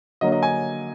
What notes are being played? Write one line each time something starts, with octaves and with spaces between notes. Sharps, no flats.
D3 F#3 A#3 D#5
D#5
G#5